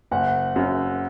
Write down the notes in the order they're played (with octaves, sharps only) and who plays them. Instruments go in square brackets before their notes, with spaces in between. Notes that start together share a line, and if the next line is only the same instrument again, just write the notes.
[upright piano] F#1 [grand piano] F#5
[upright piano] F#2 C#3